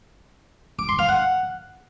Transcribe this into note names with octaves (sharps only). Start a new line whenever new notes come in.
D6
C6
F5
F#5